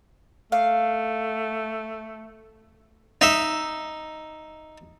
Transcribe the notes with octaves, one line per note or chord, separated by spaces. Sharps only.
A3 F5
D#4 E5